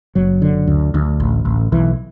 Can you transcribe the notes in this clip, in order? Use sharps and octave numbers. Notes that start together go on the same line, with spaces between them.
F#1 F#3
D3
D2
D2
A1
A1
B1 E3